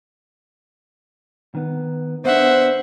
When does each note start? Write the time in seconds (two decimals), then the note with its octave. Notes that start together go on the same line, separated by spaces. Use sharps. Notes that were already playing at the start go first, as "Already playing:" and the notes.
1.55 D#3 B3
2.25 B3 D4 C5 E5 F#5